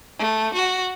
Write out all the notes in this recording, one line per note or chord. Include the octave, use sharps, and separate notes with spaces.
A3
F#4